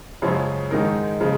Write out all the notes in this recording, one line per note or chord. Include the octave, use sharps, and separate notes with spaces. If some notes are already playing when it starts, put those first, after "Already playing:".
F#2 C#3 F3 G#3 C#4
G#2 D#3 G#3 D#4 A#4
C#3 F3 G#3